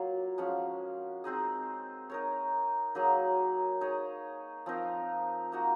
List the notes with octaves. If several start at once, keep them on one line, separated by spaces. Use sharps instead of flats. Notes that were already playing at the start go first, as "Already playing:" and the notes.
Already playing: F#3 A#3 F4
F3 G#3 C#4 F#4
G#3 C4 D#4 G#4
D#4 A#4 C#5
F#3 A#3 D#4 G#4
D#4 G#4 C#5
F3 C4 D#4 A#4
A#3 D#4 F#4